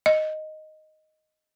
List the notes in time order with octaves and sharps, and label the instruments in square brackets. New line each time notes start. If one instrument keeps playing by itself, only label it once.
[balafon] D#5